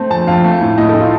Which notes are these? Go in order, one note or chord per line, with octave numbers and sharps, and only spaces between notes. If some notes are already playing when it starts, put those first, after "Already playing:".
Already playing: A3 C4
F2 A5
F2 F5
A3
A2
A2 D#5
A4
A2
F4